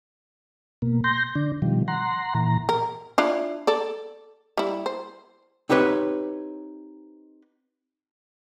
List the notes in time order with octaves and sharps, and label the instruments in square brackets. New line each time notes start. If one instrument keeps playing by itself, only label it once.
[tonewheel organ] B2 A#3
C6 G6 A#6
D3 D4
B2 D#3 F3 G3
F#5 A#5 C6
A#2 E3 A#5
[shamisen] A#4
D4 E4 F4
A4 D5
G3 E4
C5
[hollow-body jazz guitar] C4 D#4 G4 B4 C#5